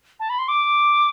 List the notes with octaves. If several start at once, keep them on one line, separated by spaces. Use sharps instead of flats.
A5
B5
C6
D6